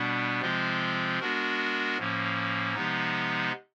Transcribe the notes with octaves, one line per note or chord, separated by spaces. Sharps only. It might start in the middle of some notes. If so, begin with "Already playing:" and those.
Already playing: B2 G3 B3 D4
C3 F3 G#3 C4 F4
G#3 B3 D4 F#4 A#4
A2 F3 A#3 C#4
C3 F3 G#3 B3 D#4